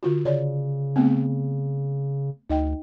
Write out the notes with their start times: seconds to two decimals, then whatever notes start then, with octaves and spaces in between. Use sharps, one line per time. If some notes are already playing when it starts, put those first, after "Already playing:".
0.03 D3 F4 F#4
0.25 C#3 C#5 D5
0.96 A3 B3 C4
2.50 D2 D#4 D#5 G5